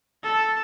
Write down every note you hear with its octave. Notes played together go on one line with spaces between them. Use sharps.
A4